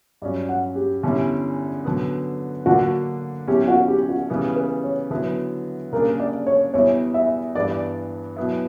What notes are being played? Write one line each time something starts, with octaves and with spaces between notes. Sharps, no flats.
G2 F#3 C#4 D5
F#5
G4
E2 D3 G3 C#4 E4
D3 F#3 B3
D3 F#3 A#3 D4 F#4
E2 B2 F#3 C#4 E4 G4
F#4
G4
F#4
C#3 E3 G3 B3
B4
C#5
D3 F#3 B3 E4 B4
C#3 G3 A#3 D4 A#4
D5
C#5
E2 B2 G3 B3 E4 C#5
E5
G2 E3 B3 D4 D5
B2 F#3 B3 E4